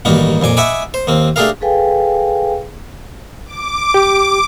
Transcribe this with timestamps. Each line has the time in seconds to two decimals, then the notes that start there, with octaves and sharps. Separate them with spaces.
0.05 A1 G2 D#3 A#3 D#4 F#4
0.42 F2 A#2 G#5 D6
0.57 D#5 E5 F#5 G#5 B5 D6
0.94 C5
1.07 D#2 A#3 C4
1.36 A3 D4 G4 G#4 A#4 F5
1.61 G#4 A4 B4 F5 G5 G#5
3.46 D6
3.94 G4